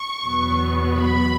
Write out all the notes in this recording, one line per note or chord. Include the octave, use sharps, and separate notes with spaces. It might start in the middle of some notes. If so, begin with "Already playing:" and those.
Already playing: C#6
E2 B2 F#3 B3
B5